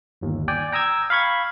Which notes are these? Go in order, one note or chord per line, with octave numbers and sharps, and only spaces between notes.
G1 D#2
D5 G5 G#5
G5 A#5 D#6 E6 G#6
F5 B5 C#6 G#6